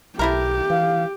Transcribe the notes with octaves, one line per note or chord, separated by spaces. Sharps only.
B1 A3 E4 G4 A#4
E3 F5